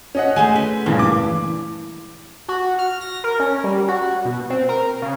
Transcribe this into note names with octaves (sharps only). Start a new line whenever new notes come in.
C#4 D#5 F#5
G#3 A3 C5 G#5
B4
G2 A#2 C#3 E3
D6
F#4
F6
A#6
A#4
C#4
G3
F#4
B2
C4
A#4
C#3